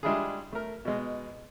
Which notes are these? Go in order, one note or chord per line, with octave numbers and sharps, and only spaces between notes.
G3 G#3 D4 E4 F4 G#4
A3 A#4
B2 G#3